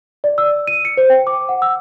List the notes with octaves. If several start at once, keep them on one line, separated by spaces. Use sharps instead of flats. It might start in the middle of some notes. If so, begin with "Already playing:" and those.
D5
E6
D#7
C#7
C5
G5
D6
F#5
E6